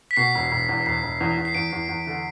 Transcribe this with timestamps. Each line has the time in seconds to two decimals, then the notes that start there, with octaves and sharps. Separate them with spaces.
0.11 B6
0.16 B2 C7
0.35 E1
0.51 E1
0.68 E2
0.86 E1 C7
1.03 E1
1.20 E2
1.37 E2
1.45 C7
1.54 E2 D7
1.72 E2
1.89 E2
2.07 D3